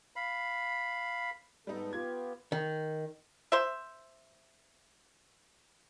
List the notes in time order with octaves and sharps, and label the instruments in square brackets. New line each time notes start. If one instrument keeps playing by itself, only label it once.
[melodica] F5 B5
[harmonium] G#2 B3 A4 [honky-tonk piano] G3 D#4
[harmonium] B3 F4 G4 [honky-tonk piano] G#6
[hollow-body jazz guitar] D#3
[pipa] C5 E5